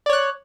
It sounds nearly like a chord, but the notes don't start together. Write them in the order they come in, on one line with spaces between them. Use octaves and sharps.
D5 C#5 F#6